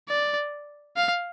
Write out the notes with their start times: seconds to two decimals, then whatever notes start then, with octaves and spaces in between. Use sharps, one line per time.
0.09 D5
0.97 F5